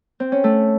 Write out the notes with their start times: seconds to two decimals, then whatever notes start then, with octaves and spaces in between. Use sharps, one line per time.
0.20 C4
0.32 C#4
0.44 A3